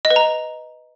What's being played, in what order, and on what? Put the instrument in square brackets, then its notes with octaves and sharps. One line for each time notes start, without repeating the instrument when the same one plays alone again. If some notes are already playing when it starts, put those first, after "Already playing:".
[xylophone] D#5
B4
A#5